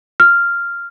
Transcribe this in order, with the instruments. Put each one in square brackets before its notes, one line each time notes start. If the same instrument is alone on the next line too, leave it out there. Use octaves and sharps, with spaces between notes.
[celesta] F6